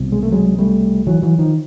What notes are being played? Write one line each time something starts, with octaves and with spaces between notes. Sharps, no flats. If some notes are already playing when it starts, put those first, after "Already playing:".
Already playing: C2 B2
G#3
A3
F#3 G#3
G3 A3
E3 F#3
E3 F#3
D#3 F3